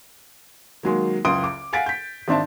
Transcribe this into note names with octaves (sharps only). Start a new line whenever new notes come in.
D#3 F#3 G#3 A#3
F#1 C#2 C6 D#6 D7
D6
F5 F#5 G#5 A6 B6 D7
G6 B6
G#1 C4 D4 E5 A5